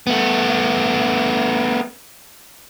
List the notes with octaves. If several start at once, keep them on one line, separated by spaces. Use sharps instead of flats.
A3 B3